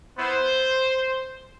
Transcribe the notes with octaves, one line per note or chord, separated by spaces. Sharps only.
B3 E4 C5